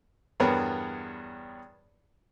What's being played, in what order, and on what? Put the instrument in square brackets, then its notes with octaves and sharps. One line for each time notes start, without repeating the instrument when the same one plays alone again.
[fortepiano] E2 G2 B3 A#4 C#5 B5